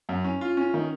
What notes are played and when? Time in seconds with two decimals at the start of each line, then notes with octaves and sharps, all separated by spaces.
0.09 F#2
0.24 C#4
0.41 F4
0.57 C#4
0.74 D#3